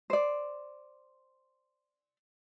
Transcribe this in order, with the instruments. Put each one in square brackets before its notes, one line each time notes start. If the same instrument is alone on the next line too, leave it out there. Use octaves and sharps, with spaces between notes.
[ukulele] C5 D5